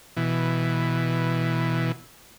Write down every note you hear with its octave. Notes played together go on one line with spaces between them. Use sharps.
B2 E3